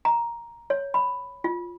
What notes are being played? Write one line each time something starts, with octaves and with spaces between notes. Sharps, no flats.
A#5
C#5
B5
F4